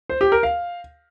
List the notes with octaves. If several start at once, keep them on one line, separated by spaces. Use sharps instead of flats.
C5
G4
A#4
F5